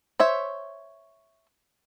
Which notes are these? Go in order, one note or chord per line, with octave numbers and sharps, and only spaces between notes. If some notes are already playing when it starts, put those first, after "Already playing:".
C5 C#5 E5